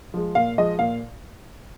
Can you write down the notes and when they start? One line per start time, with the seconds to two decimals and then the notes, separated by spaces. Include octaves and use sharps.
0.14 F3 G#3
0.35 A#2 F5
0.58 F3 G#3 D#5
0.79 A#2 F5